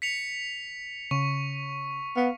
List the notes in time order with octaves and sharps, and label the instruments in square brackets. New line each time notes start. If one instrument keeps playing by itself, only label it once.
[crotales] B6 C#7 F7
[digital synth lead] C#3 [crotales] C#6
[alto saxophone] B3 [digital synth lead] F5